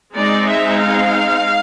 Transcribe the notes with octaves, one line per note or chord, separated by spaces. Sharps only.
G#3 C4 D#4 D5
E5
F5